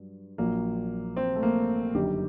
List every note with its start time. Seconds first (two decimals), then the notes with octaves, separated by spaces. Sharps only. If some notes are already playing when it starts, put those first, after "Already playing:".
Already playing: G2 F#3
0.38 A#1 A#2 F#3 A#3
1.17 C4
1.36 A3
1.43 A#3
1.95 G1 F#2 D#3 G3 G4